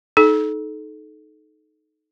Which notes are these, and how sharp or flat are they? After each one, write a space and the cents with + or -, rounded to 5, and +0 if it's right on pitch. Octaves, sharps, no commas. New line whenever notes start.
D#4 +0 A4 -30